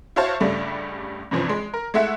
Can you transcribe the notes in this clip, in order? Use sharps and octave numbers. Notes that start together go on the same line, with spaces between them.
E4 F#4 C5 C#5 F5 A5
C#2 G2 C#3 G3 A3
G2 C3 E3 F3 C4 C#4
G#3
A#4
G#3 A3 E4 E5 F#5